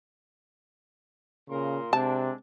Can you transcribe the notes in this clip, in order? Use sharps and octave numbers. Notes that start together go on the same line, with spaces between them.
A#2 C#3 A#4 C6
C3 G#3 C4 D4 A5